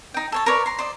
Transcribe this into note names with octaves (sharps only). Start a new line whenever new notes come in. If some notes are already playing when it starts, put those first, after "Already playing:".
D#4 G5
A4 C#5 A5
A#4 B4 C#5 D5
A#5 C6
C5 D5 D#5